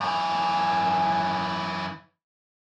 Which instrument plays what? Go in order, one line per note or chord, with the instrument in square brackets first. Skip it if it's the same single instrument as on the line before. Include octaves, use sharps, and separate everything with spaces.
[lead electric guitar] F#2 E3